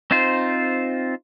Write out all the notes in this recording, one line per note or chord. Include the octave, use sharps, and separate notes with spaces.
C4 D#4 F4 C5